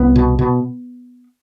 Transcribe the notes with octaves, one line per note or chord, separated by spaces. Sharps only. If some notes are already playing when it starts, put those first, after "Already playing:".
Already playing: C2 B3
B2
B2